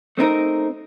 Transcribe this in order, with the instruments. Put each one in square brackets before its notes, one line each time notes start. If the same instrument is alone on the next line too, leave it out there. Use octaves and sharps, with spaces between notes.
[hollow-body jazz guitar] A3 C4 D#4 A#4